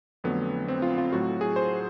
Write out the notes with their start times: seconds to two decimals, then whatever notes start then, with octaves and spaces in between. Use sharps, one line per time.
0.24 F2 D3 F#3 A3 B3
0.68 C4
0.82 F4
0.98 F4
1.12 A2 F#3 A3 F#4
1.41 G#4
1.56 C5